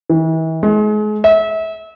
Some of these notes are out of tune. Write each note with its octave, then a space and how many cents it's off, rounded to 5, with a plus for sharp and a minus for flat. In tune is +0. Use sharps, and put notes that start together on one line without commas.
E3 -40
G#3 +35
E5 -30